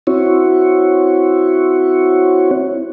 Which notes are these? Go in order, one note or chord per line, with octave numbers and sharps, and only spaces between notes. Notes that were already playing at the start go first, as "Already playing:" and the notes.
C4 E4 F#4 C#5